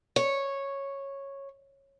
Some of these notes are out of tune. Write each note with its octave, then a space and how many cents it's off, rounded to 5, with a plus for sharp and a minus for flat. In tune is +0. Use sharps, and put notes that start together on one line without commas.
C#5 -10